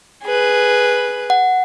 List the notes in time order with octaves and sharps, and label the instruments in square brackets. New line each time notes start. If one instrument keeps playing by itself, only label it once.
[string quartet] G#4 B4
[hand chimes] F#5